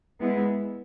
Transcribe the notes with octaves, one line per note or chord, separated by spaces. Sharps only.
G#3 B3 E4